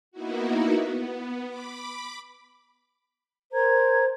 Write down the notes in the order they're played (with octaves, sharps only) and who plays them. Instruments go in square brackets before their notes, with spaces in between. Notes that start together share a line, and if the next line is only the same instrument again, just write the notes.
[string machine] A#3 B3 D#4 E4 F#4
B3
B5 D6
[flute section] A#4 C5 A#5 G#6